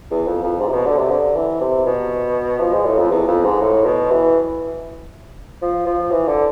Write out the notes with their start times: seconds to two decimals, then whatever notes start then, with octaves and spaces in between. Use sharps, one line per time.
0.11 E2
0.27 F2
0.44 F2
0.60 G#2
0.68 C3
0.73 B2
0.86 D3
0.99 C3
1.11 D3
1.36 E3
1.61 C3
1.86 B2
2.60 F3
2.73 G#3
2.85 A2
2.98 F2
3.11 E2
3.28 F2
3.44 G#2
3.61 A2
3.86 B2
4.11 E3
5.62 F3
5.86 F3
6.11 E3
6.28 D3